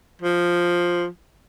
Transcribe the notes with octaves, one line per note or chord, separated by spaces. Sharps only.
F3